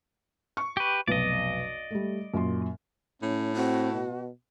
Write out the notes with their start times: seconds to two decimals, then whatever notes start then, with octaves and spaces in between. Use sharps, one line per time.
0.57 C#6
0.77 G4 B4
1.08 F1 B1 B4 D5 D#5
1.91 G3 A3
2.34 F#2 A#2 C6
3.22 A2 C#4
3.56 C4 F#4
3.93 B2